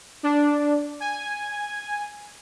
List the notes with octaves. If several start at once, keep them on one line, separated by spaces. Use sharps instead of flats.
D4
G#5